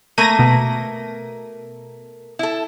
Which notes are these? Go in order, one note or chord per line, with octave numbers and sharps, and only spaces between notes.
A3 A#3 A#4 A#6 D#7
B2
E4 A4